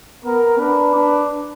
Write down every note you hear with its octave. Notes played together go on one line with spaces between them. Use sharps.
B3 A#4
D4 B4
D4